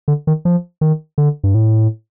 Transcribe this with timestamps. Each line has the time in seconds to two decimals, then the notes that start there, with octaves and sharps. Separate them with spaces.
0.08 D3
0.27 D#3
0.45 F3
0.81 D#3
1.18 D3
1.44 G2
1.55 A2